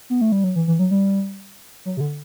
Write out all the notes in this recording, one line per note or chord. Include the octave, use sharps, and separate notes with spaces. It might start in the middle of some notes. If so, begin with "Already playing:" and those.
B3
A3
G3
F#3
E3
E3
F#3
G3
F#3
C3
D3